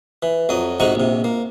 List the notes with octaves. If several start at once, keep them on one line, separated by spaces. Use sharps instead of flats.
E3
F2 F#3 D#6
G#2 C3 D#4 F#4 A#5 C#6
A#1 C3
A#3